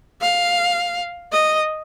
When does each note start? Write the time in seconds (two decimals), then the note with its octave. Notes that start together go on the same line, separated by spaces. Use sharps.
0.22 F5
1.32 D#5